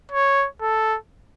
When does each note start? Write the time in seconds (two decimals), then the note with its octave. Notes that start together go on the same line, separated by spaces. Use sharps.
0.11 C#5
0.62 A4